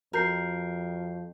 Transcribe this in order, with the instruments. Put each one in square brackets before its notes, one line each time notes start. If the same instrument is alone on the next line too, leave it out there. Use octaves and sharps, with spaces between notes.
[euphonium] F2 [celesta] F#4 G6 C7 [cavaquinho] A#4